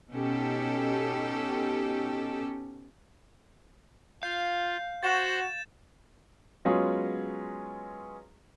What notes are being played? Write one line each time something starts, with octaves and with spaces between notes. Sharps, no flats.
B2 C#4 D#4 G4 A4
F4 F5 G6
F#4 C5 F#5 A6 E7
F#3 G#3 B3 C#4 F4 G#4